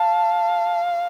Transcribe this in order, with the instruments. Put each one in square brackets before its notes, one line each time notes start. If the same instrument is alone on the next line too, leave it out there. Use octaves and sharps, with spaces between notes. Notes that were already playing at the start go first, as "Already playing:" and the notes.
Already playing: [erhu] F5 [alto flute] A5